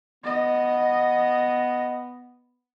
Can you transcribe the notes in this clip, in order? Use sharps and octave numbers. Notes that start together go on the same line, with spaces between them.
B3 D#5